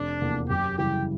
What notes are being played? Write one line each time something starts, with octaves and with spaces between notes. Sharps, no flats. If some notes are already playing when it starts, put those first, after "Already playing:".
Already playing: F1 D4
E2 C3 F3 A#3
F#2 G4
C#3 E3 G3 G4